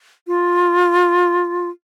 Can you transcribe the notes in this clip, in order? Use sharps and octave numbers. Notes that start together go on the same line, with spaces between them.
F4